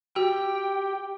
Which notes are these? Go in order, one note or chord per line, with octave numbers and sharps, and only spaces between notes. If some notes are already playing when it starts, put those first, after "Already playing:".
F#4 G4 G5